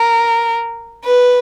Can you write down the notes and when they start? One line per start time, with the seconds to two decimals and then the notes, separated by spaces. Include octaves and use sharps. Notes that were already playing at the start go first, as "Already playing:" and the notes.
Already playing: A#4
1.04 B4